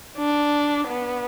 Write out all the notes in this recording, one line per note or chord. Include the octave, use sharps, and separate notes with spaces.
D4
B3